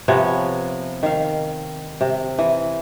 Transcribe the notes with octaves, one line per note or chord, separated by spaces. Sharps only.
C3 F3 B3 C#5
D#3 F5
C3
E3